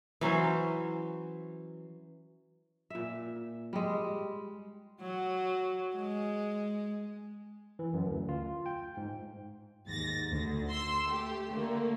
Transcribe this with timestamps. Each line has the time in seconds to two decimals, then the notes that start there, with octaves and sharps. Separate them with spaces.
0.21 E3 F#3 C#4 C5
2.90 A#2 E5
3.73 G3 G#3
5.01 F#3
5.96 G#3
7.79 E3
7.94 F#2
8.08 D2
8.29 F4
8.66 G5
8.97 G#2
9.87 D#2 G#2 A6 A#6
10.31 D2
10.70 C6 E6
11.10 A3 G4
11.50 D3 A3 A#3